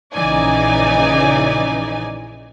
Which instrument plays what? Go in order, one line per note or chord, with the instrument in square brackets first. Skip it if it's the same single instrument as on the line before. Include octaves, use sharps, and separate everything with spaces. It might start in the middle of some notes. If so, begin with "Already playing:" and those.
[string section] A#1 C#3 E3 D#4 D5 G#5